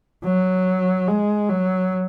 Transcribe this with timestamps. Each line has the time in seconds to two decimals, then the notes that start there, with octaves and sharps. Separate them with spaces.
0.24 F#3
1.07 G#3
1.49 F#3